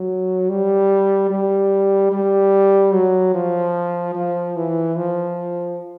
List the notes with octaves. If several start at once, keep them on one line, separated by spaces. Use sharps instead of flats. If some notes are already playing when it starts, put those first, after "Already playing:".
Already playing: F#3
G3
G3
G3
F#3
F3
F3
E3
F3